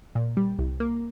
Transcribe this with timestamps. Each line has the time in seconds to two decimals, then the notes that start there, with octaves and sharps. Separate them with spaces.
0.15 A#2
0.37 G3
0.59 C2
0.80 A#3